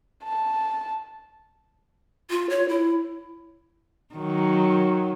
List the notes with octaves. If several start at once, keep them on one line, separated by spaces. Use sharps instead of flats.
A5
F4
C#5
E4
D#3 F#3